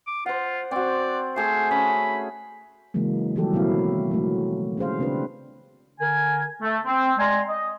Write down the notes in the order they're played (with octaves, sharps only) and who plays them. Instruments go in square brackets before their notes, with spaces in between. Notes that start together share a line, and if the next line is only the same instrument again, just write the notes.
[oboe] D6
[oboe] F4 [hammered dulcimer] C5 F#5
[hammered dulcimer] C4 F#4 [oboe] D5
[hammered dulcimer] A3 G#4 [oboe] C5
[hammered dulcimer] C#4 [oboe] B5
[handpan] C#3 E3 F#3 G#3 A#3
D#3 E3 F#3 G3 G4 A4
B2 F#3 A#3 C4 E4 F5
F#3 A3
C#4 G#4 C5 F5
C#3 C4 D4 G4 B4
[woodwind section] D3 A#4 G#5
A3
C4
G#3 D5 G#5 A#5 C6
D#5